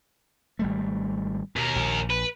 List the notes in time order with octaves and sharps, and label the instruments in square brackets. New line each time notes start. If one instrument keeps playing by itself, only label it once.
[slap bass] G#1 G3 A3
[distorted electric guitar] D#2 A#4 [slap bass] B2
[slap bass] A#1
[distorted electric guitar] B4